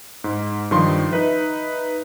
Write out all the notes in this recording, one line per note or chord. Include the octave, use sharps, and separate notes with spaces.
G#2
G2 D#3 F3 C6
D#4 B4 E5